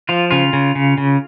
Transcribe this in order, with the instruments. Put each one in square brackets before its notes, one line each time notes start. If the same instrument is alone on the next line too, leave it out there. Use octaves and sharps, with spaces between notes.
[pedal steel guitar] F3 F4
C#3 F4
C#3
C#3
C#3